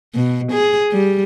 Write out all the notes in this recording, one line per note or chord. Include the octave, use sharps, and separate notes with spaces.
B2
G#4
G3